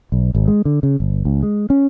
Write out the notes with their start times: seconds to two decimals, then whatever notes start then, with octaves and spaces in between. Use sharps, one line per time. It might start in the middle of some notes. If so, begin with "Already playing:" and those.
0.12 B1
0.35 G#1
0.48 G#3
0.65 D3
0.83 C#3
1.00 G1
1.25 C#2
1.43 G#3
1.70 C#4